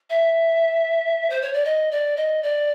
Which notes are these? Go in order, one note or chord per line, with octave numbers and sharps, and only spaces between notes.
E5
C5
C#5
D5
D#5
D5
D#5
D5